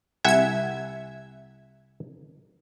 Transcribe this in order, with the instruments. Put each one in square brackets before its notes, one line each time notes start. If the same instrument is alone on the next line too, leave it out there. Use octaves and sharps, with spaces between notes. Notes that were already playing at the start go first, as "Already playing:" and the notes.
[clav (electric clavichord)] C2 F#5 G#5 [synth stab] E5 G#6